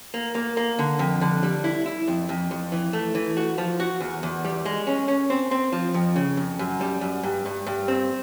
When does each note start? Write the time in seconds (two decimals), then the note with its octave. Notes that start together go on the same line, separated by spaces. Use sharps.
0.14 A#3
0.35 A#3
0.57 A#3
0.79 D3
0.99 F2
1.21 D3
1.43 G3
1.64 E4
1.86 E4
2.07 F2
2.29 F2
2.51 F2
2.72 E3
2.93 A3
3.15 E3
3.37 F#4
3.58 F3
3.80 F#4
4.00 E2
4.23 E2
4.44 G3
4.65 G#3
4.87 C#4
5.08 C#4
5.30 C4
5.51 C4
5.73 F3
5.94 F2
6.16 C#3
6.37 F2
6.59 F#2
6.81 G3
7.01 F#2
7.23 G2
7.46 G2
7.67 G2
7.88 C4